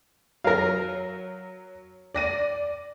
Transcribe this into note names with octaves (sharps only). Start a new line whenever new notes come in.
F#3 A#4 F5 A#6
D5 A#6 D#7